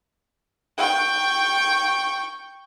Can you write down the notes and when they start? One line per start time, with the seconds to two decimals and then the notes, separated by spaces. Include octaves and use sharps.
0.78 G5 C#6